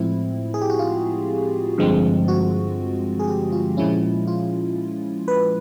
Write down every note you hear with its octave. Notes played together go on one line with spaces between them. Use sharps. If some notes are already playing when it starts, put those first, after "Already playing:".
Already playing: A2 F3 G#3 C4 E4
G#4
G4
F#4
F4
G2 D3 F3 G#3 C4
F#4
G#4
G4
F4
A#2 F3 G#3 C#4 E4
F4
B4